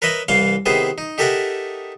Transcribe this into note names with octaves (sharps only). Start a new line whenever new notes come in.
A#4 B4 C#5 D#5 E5 B5
C2 E3 C#5 F5 C6
C3 D#3 B3 E4 G#4 C5
D#4
D#4 G4 A4 A#4 E5 F#5